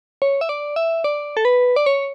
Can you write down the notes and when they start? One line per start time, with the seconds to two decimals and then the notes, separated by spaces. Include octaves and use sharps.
0.22 C#5
0.41 E5
0.49 D5
0.76 E5
1.04 D5
1.37 A4
1.45 B4
1.76 D5
1.86 C#5